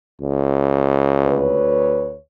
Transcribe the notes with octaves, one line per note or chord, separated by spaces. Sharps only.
C#2
D2 B4 C#5